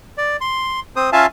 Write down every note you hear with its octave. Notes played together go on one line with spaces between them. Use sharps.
D5
C6
C4 C5 D#6
C#4 F4 E5 F5 G#5 A5